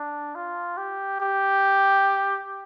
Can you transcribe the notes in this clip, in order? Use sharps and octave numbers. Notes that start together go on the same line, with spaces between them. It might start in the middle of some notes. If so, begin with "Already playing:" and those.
Already playing: D4
F4
G4
G4